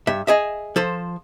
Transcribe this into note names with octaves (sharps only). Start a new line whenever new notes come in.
G2 E5
G#4 D#5 E5
F3 A4 C5